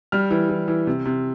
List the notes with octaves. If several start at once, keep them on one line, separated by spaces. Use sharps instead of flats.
G3 F6
E3
E3
E3
C3
C3